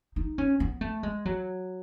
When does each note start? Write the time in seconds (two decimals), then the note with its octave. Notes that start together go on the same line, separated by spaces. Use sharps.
0.16 D#4
0.38 C#4
0.60 B3
0.81 A3
1.03 G#3
1.25 F#3